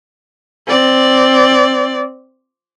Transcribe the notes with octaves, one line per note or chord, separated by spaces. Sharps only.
C4 D5